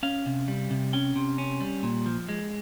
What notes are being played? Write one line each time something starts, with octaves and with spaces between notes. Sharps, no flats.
C#4 F5
C3
G3
C3
C#4 G5
C3
C#4
G3
A#2
F3
G#3